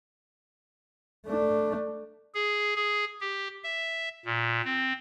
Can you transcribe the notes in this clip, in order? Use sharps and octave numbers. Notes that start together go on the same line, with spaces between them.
A3 D4
G#4
G#4
G4
E5
A#2
C4